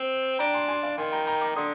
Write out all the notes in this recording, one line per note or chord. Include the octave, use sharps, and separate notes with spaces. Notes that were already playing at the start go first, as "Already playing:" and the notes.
Already playing: C4
D4 G5 A#5
G#5 C6
G#5 C6
D5 F5
D#3 G#5 C6
G5 A#5
G5 A#5
A#5 D6
D3 C6 D#6